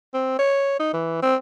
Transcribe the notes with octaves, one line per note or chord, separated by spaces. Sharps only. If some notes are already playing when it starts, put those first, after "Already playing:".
C4
C#5
D#4
E3
C4